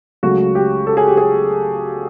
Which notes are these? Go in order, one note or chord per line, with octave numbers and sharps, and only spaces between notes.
C#2 C#3 F#3 A3 F#4
G4
A4
G#4
G4
G#4